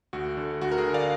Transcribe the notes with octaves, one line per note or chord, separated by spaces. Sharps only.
D2 F#4
D3
D2 F#4
A#4
G#4
D3
D5 F5